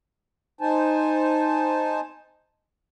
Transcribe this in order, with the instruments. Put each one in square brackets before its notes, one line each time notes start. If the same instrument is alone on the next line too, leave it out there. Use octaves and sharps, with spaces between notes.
[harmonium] D#4 C5 G#5 A5